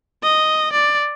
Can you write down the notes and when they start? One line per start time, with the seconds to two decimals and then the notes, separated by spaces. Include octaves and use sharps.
0.23 D#5
0.72 D5